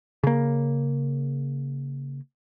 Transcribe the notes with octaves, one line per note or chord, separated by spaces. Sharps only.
C#3 A#3